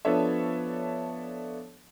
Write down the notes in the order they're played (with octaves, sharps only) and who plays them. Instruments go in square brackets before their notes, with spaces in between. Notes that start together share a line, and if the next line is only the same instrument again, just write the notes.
[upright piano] F3 B3 D4 A4 C#5 E5